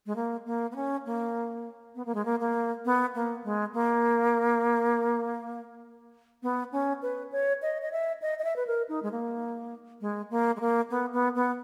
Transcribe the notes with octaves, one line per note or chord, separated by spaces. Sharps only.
G#3
A#3
A#3
B3
C#4
A#3
B3
A#3
G#3
A#3
A#3
B3
A#3
G#3
A#3
B3
C#4
B4
C#5
D#5
D#5
E5
D#5
D#5
E5
B4
A#4
D#4
G#3
A#3
G#3
A#3
G#3
A#3
B3
B3
B3